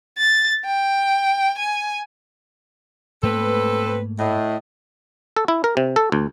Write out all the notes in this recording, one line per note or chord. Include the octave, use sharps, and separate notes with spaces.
A6
G5
G#5
G#2 A3 A#3 C4 A4 B4
A2 D#5
A4
E4
A#4
C3
A4
D2